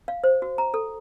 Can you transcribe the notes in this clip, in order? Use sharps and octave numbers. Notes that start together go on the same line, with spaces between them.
F5
C5
F#4
A#5
A4